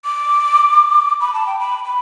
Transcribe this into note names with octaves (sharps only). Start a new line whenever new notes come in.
D6
B5
A5
G5
B5
B5